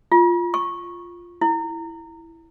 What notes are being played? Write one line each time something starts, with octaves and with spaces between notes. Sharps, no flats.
F4
C#6
E4